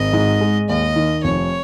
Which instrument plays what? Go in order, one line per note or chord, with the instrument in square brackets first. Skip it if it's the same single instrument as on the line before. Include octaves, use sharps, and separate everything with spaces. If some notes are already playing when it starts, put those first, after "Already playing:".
Already playing: [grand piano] G#1 [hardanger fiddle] D#5
[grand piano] G#2
G#3
[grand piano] D#2 [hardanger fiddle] D#5
[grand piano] D#3
[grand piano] F1 [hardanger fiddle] C#5